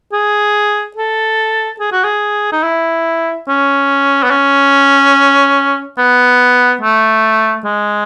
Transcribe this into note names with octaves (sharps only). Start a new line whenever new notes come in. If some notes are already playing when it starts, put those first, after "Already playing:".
G#4
A4
G#4
F#4
G#4
D#4
E4
C#4
B3
C#4
B3
A3
G#3